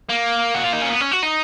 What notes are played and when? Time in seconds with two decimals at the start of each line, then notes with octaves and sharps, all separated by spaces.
0.09 A#3
0.55 F#4
0.64 F4
0.73 D#4
0.82 C#4
0.90 B3
1.01 C#4
1.12 F#4
1.23 D#4